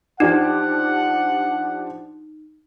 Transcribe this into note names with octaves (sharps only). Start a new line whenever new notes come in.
F3 D4 D#4 G4 F#5